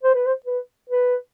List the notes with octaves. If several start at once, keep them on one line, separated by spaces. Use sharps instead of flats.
C5
B4
C5
B4
B4